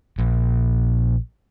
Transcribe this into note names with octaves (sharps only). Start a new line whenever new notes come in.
A#1